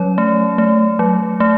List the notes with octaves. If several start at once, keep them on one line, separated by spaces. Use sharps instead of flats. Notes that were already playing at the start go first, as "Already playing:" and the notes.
Already playing: F#3 C#4 C#5
A3
A3
F#3
A3